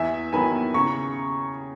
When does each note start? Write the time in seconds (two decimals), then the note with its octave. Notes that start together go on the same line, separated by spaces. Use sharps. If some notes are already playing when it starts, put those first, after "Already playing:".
Already playing: E2 E5 G#5
0.33 D#3 F#3 B3 G#5 B5
0.74 C#3 A#5 C#6